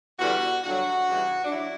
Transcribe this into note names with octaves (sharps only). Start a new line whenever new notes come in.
E2 D3 G3 F#4
G2 D3 F#3 F#4
E2 C#3 E3 G3
D4
F#3 E4